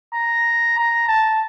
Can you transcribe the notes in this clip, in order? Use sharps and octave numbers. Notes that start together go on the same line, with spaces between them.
A#5
A#5
A5